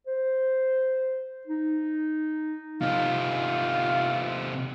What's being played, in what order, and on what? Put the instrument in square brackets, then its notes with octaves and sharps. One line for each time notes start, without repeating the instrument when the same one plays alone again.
[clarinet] C5
D#4
[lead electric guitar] C3 D#4 [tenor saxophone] F4